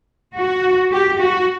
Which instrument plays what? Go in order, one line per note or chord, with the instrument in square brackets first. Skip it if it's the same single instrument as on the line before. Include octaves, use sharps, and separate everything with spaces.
[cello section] F#4
G4
F#4